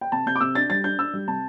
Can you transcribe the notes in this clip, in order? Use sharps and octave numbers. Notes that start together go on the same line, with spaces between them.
G5
C3 A5
C3 G6
D6
C3 E6
D4 A6
G3 A6
D4 G6
D4 E6
G3
C3 A5